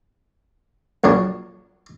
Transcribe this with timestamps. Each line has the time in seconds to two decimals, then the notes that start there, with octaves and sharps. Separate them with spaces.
1.04 A#1 F#2 C#3 D4